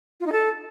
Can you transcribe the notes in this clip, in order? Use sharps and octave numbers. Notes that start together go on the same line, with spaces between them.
F4
D#4
A4